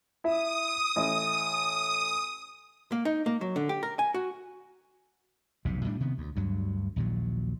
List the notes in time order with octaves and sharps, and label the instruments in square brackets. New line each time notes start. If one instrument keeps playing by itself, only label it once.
[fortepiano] E4 E5 [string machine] D#6
[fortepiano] A1 E4 D#5
[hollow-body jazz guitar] A#3
D#4
A#3
F#3
D3
G4
A#4
G#5
F#4
[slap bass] F1 B1 G#2 C3
A2 G3 G#3 D4
C3 D#3 B3
D2
D2 G2 F#3
A#1 D#2 A#2 F#3